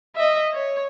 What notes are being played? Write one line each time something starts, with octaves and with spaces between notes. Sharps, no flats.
D#5 E5
C#5